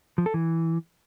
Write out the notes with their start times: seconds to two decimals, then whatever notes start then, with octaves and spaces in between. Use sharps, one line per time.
0.18 F3
0.26 A4
0.34 E3